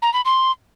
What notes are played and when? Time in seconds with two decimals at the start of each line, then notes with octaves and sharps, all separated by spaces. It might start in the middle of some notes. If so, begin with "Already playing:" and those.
0.02 A#5
0.14 B5
0.25 C6